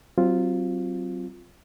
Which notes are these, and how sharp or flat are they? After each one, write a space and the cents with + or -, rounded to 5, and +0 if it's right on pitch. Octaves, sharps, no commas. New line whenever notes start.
F#3 +30 C4 +0 F4 +0